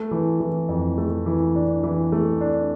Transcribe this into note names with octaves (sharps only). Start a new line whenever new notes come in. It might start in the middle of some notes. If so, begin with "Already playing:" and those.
Already playing: A3
E3
E3
F2
A3
E3
D4
E3
A3
D4